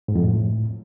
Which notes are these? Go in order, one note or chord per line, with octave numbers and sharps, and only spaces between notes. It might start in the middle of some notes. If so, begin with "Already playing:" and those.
G#2
F2
A2